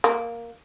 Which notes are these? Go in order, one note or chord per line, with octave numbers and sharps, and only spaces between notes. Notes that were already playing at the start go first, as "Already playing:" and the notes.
A#3